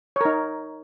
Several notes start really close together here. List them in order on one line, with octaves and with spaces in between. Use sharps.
C#5 A#4 D#4